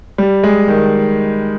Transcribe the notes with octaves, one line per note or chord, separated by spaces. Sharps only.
G3
G#3
D#3